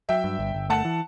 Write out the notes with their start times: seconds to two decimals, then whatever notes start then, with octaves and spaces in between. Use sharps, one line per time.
0.09 F#3 E5 G5
0.24 G2
0.39 G1
0.54 G1
0.70 A3 F#5 A5
0.85 E3